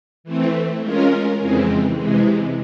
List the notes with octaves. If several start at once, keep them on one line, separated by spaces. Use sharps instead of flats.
E3 A3 C4
G#3 C#4 F4 A#4
F2 C#3 E3 G#3 C4
C3 E3 G#3